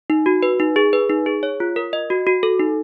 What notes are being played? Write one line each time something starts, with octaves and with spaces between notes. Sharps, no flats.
D#4
F#4
B4
D#4
G#4
B4
D#4
G#4
C#5
F4
A#4
D#5
F#4
F#4
A4
D#4